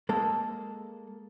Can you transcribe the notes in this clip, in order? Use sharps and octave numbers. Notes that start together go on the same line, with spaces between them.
G#3 A#3 A4